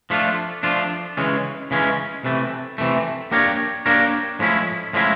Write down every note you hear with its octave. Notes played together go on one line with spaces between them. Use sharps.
F3 A3 D4 F4
F3 A3 D4 F4
C#3 E3 G#3 C#4
C#3 E3 G#3 C#4
C3 E3 A3
C3 E3 A3
A#3 D4 G4 A#4 C#5
A#3 D4 G4 A#4 C#5
A2 F3 G#3 C#4 E4
A2 F3 G#3 C#4 E4